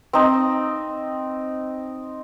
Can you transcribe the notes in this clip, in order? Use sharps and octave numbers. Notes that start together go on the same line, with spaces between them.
C4 D#4